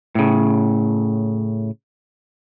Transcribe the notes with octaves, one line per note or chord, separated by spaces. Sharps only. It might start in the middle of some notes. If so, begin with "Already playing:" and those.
A2 C#3